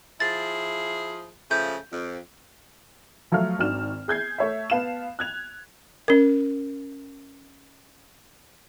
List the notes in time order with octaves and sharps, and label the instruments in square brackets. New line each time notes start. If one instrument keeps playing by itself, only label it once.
[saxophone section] F3 E4 G#4 [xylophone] A6
[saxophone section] C#3 F3 A3 [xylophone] G6
[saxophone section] F2
[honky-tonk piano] F3 F#3 A3 F5 F6
G#1 D#3 D4 F#4 F6 E7
G#4 G6 G#6 C7
A3 C#5 E5
B3 F5 A5 E7
F#6 G#6 F7
[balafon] C#4 A#4